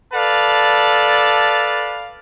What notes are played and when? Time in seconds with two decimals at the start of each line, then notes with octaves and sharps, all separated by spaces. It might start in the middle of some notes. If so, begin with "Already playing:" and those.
0.13 A4 B4 D5 F5 A5